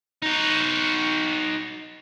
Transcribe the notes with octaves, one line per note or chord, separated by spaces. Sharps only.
D#4 F#4